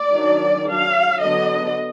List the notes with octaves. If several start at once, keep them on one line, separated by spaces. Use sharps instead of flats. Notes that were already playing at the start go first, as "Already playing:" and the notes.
Already playing: D5
D#3 F#3 D4
F#3 D4 F5
D3 F#3 B3 D4 D#5